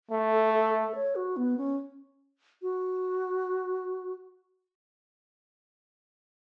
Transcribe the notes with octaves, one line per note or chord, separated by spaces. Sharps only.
A3
A4
A4
A4
C#5
F#4
B3
C#4
F#4